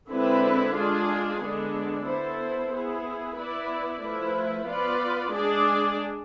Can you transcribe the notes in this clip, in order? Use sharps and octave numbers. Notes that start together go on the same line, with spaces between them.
D3 G#3 C4 E4 B4
G#3 D4 F4 G#4
D3 G#3 B3 D4
B3 E4 A4 C5
B3 E4 G#4
B3 E4 B4 D5
F3 A3 E4 B4
B3 F4 B4 D5
G#3 D4 G#4 D5